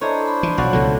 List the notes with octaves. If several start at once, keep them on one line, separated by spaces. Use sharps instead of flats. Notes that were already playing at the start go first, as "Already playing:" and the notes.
D4 E4 A4 C5 C#5 D#5 A#5
B5
E3
B1 F#4 C#5 D5 F5 F#5
C#2 B2 D3 F3